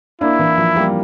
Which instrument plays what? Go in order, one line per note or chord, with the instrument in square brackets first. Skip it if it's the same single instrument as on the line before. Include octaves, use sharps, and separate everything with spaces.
[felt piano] A#3 D4 [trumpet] E4
[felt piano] E3
F3
G3 A#3